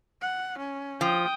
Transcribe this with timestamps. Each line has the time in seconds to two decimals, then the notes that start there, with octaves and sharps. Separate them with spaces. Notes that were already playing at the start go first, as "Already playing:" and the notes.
0.22 F#5
0.58 C#4
1.01 F3 G5 D#6